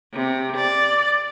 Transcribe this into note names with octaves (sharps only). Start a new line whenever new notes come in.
C3
D5